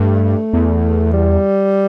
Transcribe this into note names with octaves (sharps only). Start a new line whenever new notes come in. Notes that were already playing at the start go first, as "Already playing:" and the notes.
Already playing: G2 A3
E2
G3